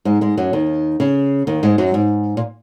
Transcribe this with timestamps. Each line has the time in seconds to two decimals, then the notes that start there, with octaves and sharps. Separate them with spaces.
0.05 G#2 G#3
0.21 G#2 G#3
0.37 F#2 F#3
0.53 D#2 D#3
1.00 C#3
1.47 D#2 D#3
1.63 G#2 G#3
1.78 F#2 F#3
1.94 G#2
2.37 A#2